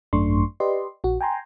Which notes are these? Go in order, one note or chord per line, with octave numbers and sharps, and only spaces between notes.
G#1 F#2 A3 D4 C6 C#6
G4 B4 D5 D#5 C6
A#1 F#4
G5 G#5 A#5 C6